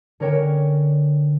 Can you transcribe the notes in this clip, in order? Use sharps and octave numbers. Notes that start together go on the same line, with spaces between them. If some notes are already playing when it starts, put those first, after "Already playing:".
D3 C#4 A#4 C#5 G5 E7